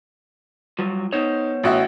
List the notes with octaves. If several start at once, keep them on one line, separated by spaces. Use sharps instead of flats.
F#3 G3 F4
B3 D#4 C5 C#5
A1 F#4 E5